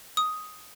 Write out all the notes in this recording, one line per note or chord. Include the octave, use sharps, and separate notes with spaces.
D#6